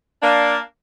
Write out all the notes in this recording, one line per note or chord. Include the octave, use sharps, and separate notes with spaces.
A#3 D4